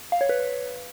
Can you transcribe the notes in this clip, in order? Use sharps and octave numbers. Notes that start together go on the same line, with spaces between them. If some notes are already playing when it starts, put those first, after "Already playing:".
F5
C#5
B4